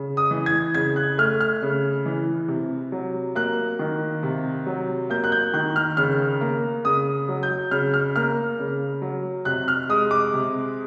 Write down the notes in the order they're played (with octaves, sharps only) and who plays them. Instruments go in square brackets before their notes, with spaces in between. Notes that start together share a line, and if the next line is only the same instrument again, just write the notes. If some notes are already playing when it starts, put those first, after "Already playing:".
Already playing: [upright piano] C#3
D#6
E3
G#6
C#3 G#6
F#6
A3 F6
F6
C#3
E3
C3
F#3
A#3 F#6
D#3
C3
F#3
A#3 G6
F#6
G6
D#3 F#6
F6
C#3 F6
A#3
C#3 D#6
F#3
G6
C#3 F6
F6
A#3 F6
C#3
F#3
C3 F#6
F6
G#3 D#6
D6
C3